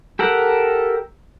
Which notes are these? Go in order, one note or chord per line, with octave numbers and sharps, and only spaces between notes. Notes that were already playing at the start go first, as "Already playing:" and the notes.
G4 A4 A#4 F#5